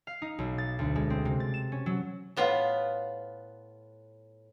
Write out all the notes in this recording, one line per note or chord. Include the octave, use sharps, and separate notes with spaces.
F5
D#4
B1
A6
D2
G#3
C4
C3
A6
E7
C#4
F#3
A2 B3 F4